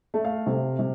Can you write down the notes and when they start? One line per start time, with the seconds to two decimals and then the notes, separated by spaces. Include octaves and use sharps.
0.14 A3
0.25 F5
0.47 C3
0.79 C3